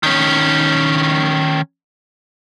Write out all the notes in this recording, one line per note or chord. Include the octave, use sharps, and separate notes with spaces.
D#3 C#4